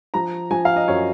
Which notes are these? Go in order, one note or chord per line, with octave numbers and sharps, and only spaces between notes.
F3 A#5
F3 G#5
F5
D#5
F#2 C#5